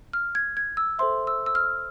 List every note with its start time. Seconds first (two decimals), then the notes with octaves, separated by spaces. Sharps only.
0.13 F6
0.35 G#6
0.57 G#6
0.77 E6
0.99 A4 C5 E5 C6
1.27 E6
1.46 E6
1.55 F6